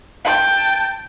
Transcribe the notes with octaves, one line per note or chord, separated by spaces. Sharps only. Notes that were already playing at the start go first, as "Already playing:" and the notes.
G5 A5